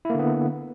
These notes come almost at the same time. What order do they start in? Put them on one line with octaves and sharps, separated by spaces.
E4 A#3 D3 B3